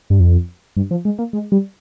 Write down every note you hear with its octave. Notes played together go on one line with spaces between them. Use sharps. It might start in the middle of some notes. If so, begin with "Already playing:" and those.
G2
F2
G2
F3
G#3
A#3
G#3
G3